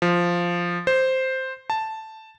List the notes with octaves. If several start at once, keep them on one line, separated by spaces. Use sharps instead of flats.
F3
C5
A5